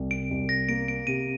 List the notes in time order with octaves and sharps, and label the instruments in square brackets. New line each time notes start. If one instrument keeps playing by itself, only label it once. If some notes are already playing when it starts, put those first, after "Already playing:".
Already playing: [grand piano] C2
[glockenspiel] D7
[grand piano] C2
[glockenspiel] A#6
[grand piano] A#3 [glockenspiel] D7
[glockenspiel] D7
[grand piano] C3 [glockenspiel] D#7